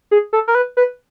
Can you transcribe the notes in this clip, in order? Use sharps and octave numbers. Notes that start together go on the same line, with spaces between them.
G#4
A4
A#4
B4
B4